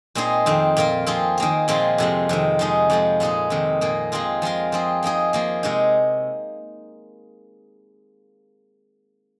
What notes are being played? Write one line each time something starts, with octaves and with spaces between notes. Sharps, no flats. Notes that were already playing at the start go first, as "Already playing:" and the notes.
A#2 G#3 C4 D#4 G#4
F2 D#3 C4
A#2 A#3 F4 A#4
F3 C4 F4 G#4
D#3 A#3 G#4
A#2 F3 G#3 C4 F4
F2 C3 F3 G#3
F2 C3 D#3
F3 G#3 D#4 G#4
F2 F3 G#3
A#2 G#3 D#4 G#4
F2 C3 D#3
A#2 A#3 G#4
F3 G#3 C4 F4 G#4
F3 G#3 F4 A#4
F3 C4 G#4
F3 A#3 D#4 G#4
F3 A#3 G#4
C3 G#3 D#4